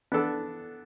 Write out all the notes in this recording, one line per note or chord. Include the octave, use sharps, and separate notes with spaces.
B3 D4 A4 D5